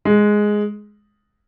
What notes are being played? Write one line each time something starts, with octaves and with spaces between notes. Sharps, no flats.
G#3